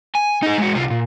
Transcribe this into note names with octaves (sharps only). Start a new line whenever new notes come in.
G#5
D#4 G#4
G#3 F#4
C2 F4
A#2